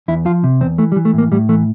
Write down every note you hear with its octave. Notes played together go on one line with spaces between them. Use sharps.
E2 E4
F3 F4
C3
E2 C4
E3 A3
G3
E3
A3
A2 A#3
A2 G3
E3 A3